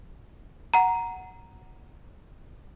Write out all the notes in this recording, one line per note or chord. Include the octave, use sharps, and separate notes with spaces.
F#5 A#5